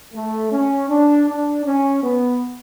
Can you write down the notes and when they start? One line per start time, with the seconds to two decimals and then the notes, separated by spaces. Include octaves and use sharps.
0.14 A3
0.51 C#4
0.89 D4
1.27 D4
1.65 C#4
2.02 B3